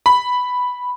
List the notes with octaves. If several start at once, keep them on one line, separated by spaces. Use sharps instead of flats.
B5